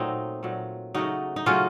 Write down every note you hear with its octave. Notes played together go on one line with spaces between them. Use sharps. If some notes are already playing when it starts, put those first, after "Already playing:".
Already playing: A#2 F#3 A3 C4 D#4
A#2 F#3 A3
C#3 F#3 A3 D#4 F#4
D#4
C#3 F#3 A3 C#4 F4